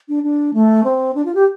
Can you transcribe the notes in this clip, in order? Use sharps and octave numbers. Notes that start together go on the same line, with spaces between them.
D4
D4
A3
C4
D4
F4
G4